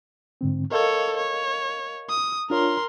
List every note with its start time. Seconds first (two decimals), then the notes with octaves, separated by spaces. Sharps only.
0.41 G#2 D3 C4
0.71 A4 A#4 C#5 D#5 F5
1.17 C#5
2.09 D#6
2.50 D4 F4 A#4 C#5 C6